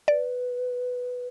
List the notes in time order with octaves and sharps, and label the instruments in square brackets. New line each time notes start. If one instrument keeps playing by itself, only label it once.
[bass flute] B4 [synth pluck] D5